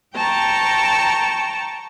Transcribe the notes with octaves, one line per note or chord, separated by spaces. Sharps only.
G5 A5 A#5 C#6